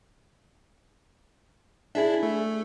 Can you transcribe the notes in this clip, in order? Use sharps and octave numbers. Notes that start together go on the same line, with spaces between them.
D4 E4 G#4 E5
A3